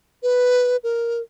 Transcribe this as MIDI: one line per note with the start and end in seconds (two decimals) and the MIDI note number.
0.23 0.77 71
0.84 1.21 70